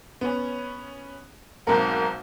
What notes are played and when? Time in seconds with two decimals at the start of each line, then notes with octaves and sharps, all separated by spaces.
0.21 B3 C#4
1.67 B1 G#2 A#3 C4 A#4 F#5